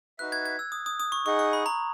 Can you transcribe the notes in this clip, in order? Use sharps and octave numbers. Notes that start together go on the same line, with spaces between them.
D#4 F#4 B4 E5 F#6
G#6
G#6
E6
D#6
D#6
D#6
C#6
D#4 G#4 D#5 F#5 C#6
C#6
B5
A#5